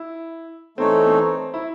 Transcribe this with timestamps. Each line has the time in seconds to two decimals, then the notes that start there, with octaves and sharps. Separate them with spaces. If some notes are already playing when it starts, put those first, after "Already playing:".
Already playing: E4
0.78 E3 A3 C4 D#4 A4 C#5
1.06 C4
1.54 E4